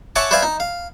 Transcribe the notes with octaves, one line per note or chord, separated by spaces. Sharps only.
C#5 E5 F#5 G#5 A5 D6
B4 C5 D5 E5 F5 G#5
D#4
F5